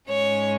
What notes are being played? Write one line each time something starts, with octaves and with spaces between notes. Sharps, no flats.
G#2 G#3 C#4 C#5